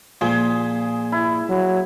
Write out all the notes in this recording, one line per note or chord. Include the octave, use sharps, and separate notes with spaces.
A#2 F3 G#4
E4
F#3